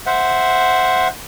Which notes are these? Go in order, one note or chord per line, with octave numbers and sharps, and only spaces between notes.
C5 E5 F#5